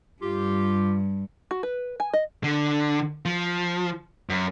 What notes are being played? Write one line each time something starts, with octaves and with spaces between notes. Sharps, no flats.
G2 F4 G4
F#4
B4
G#5
D#5
D3
F3
F#2